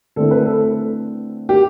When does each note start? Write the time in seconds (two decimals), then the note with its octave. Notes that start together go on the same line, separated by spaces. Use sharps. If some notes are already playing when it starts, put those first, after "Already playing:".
0.16 D3 A3 C4 E4 A4
0.31 B4
0.46 A4
1.49 G4